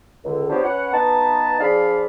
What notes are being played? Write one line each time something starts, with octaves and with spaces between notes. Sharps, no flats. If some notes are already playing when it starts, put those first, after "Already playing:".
C#2 D3
B3 D4 F4 G4 C5 C#5
C#4 B4 C#5 F#5
B3 D#4 B4 A5
F3 D4 G#4 D5 F5 B5